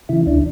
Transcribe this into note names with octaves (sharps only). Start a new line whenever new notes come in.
C#3 E3 E4
D2 D4